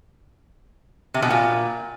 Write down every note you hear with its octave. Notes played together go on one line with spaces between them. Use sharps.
C3
B2
A#2